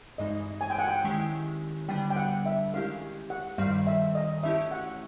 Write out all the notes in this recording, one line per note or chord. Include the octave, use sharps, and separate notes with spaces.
G2 E3 G#3 C4 D#4 D#5
G#5
G5
F#5
G5
D#3 G#3 C#4 E4 G4
D3 G3 B3 D4 G5
G5
F#5
E5
D#3 G#3 C#4 E4 G4 F5
F#5
G2 D#3 G3 C4 F5
E5
D#5
E3 A3 C#4 E4 G4 E5
F#5